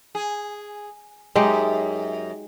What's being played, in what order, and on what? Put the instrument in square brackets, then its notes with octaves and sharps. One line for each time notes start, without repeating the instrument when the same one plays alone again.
[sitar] G#4
[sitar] F#2 [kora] G#3 D#4 G4